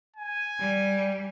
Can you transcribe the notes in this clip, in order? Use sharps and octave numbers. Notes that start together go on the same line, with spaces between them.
G#5
G3